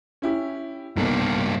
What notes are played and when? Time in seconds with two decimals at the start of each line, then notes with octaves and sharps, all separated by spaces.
0.22 C#4 E4 G4
0.96 B1 G2 A#3